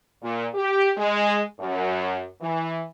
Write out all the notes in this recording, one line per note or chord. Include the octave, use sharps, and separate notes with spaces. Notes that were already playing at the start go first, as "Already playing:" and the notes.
A#2
G4
G#3
F#2
E3